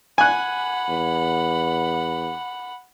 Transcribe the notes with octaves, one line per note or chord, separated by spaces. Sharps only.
F#5 G#5 B5 F#6
E2